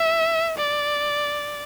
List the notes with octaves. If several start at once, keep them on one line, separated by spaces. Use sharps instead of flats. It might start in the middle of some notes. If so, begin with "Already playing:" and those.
Already playing: E5
D5